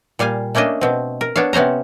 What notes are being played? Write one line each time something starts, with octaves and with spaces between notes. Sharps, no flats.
A#2 G3 F5 G#5
A3 A#3 C#4 D4 D#5
B2 C4
A#4
B3 D4 C#5 F5
C3 B3 C#4 C5 A#5